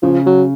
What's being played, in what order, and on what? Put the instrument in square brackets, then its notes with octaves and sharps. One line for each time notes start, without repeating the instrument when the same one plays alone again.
[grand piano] C#3 [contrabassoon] F3
[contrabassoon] F#3